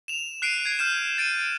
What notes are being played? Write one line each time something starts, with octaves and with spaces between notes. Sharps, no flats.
E7 F7
F#6 C7 D7 D#7
G#6 C7
F6 G6 E7
A6 D7 D#7